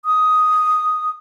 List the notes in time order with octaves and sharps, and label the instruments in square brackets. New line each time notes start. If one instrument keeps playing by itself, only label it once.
[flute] D#6